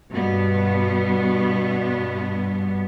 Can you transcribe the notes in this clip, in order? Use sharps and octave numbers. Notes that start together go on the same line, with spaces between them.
G2 B2 B3